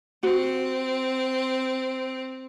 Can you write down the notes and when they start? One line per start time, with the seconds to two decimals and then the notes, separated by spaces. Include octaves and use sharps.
0.23 C4 F#4